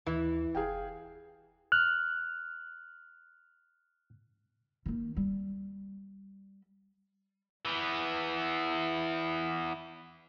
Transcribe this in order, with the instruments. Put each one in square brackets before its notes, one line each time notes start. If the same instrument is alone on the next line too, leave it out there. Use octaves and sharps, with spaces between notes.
[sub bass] D#2 [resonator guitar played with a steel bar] E3 [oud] E4
[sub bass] F1 [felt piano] G#4 F5 G5
[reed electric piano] F6 F#6
[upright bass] D#3 A#3
G3
[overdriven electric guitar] E3 B3